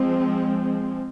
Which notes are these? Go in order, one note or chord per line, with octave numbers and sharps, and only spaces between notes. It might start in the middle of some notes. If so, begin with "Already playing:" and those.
Already playing: F3 G#3 C4